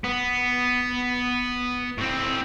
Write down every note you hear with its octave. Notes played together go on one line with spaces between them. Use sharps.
B3
A2 C4